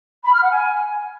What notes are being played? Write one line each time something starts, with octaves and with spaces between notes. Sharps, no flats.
B5
F6
F#5
G#5